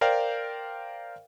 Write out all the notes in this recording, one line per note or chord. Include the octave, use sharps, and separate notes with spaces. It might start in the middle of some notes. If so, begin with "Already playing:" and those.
A#4 C5 D5 F5 G5